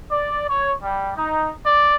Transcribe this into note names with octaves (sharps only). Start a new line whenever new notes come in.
D5
C#5
G3
D#4
D5